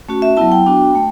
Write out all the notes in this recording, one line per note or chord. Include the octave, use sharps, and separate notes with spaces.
A3 C#4 F#4
E5
F#3 B3 E4 A5
G5
B3 D4 F#4
A3